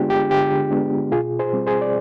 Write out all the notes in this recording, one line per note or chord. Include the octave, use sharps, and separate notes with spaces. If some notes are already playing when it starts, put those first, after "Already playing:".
Already playing: D3 G#3 B3 D4 F4 G4 G#4
G4
D3 G4
G#3 B3 D4
B2 F4 G#4
G#4 C5
G3 C4
G#4 C5
D5